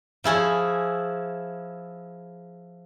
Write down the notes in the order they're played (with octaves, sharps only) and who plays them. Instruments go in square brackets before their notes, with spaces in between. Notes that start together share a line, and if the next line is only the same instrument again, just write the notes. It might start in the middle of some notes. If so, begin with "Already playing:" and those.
[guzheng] F3 E4 G#4 C#5